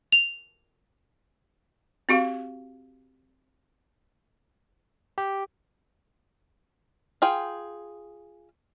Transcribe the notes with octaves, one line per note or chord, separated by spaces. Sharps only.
F7
C4 F#4 G4 F5
G4
F4 G#4 G5